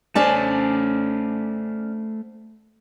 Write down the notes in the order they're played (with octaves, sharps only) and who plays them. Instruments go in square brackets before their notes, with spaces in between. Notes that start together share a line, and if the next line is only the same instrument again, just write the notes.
[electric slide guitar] A3 C5 [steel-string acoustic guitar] C#4 D5 A5